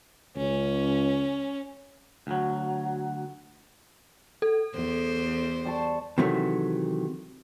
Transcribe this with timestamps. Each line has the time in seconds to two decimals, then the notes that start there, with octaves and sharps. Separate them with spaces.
0.36 C#2 C#4
2.27 D2 F#3
4.42 A4
4.75 E2 C5
5.65 G3 A5 C#6
6.18 C3 D#3 E3 F#3 A3